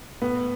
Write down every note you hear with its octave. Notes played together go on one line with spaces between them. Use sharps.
A2 B3